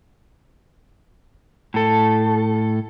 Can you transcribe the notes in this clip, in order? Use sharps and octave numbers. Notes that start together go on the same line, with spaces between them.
A2 A4